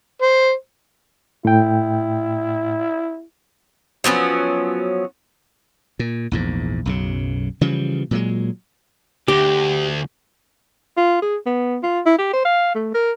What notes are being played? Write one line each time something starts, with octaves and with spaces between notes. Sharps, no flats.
C5
A2 E4 G5
F3 F#3 B3 C#4
A#2
A#1 E2 G#2
B1 F#2 C#3
C#3 E3 F3 G3
A#2 F#3 G#3
D2 G4
F4
G#4
B3
F4
E4
G4
C5
F5
A3
A#4